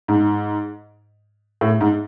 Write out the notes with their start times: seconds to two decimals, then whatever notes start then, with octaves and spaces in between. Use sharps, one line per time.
0.08 G#2
1.61 A2
1.81 G#2